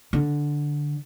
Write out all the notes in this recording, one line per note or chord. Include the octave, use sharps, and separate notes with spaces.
D3